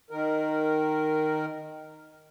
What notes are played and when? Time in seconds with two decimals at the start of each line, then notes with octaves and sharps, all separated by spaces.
0.10 D#3 A#4